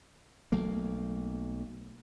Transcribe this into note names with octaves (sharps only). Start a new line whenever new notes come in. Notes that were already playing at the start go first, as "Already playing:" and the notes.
B1 F#3 A3 A#3